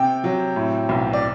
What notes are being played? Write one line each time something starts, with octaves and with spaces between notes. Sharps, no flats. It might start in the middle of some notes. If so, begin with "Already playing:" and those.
Already playing: C3 G5
F#3
A2
B1
D5